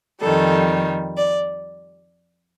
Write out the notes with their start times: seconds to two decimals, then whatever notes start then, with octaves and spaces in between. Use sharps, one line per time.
0.22 F2 D#3 G3 A4
1.17 D5